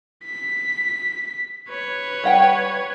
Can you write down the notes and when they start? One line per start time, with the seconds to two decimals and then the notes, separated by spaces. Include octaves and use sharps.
0.25 B6
1.68 B4 C#5
2.24 G3 F#5 G5